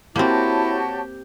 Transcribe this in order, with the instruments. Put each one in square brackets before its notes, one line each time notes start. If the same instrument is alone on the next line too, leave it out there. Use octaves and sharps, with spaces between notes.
[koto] A#3 C4 [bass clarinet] E4 [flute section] F#4 C#5 A5 [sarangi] G4